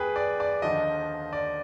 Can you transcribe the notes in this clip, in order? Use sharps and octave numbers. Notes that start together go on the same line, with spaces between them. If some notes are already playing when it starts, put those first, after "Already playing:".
Already playing: D#2 D#3 G#4 B4 G5
D5
D5
D#2 D3 F3 D#5
D5